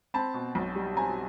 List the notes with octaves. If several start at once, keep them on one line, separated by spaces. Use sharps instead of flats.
C4 A5 B5
B2
B1
G3
C4 G#5 A#5